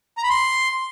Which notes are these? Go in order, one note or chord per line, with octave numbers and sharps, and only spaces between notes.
A#5
B5
C6